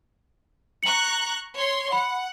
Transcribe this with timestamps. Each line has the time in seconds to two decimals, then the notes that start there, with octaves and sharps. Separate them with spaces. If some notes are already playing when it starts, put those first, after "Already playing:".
0.83 A#5 C#6 F#6 C#7 F#7
1.56 C#5 C6
1.92 F#5 B5